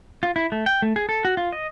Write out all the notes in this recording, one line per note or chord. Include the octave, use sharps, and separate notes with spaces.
F4
E4
A3
G5
A3
G#4
A4
F#4
F4
D#5